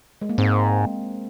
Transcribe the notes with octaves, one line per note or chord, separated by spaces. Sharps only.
G#3
A#3
G#2 G#3 C4